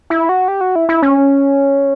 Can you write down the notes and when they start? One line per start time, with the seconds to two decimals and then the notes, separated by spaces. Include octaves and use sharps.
0.10 E4
0.29 F#4
0.48 G4
0.61 F#4
0.76 E4
0.89 E4
1.02 C#4